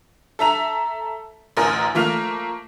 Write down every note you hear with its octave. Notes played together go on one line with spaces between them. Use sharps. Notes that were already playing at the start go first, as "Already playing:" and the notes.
A4 E5 A#5 F7
A1 D2 A#4 G#5
F3 A3 A#3 F6 F7